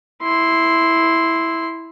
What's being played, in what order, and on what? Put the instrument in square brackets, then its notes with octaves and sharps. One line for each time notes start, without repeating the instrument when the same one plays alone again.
[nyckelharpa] E4 C6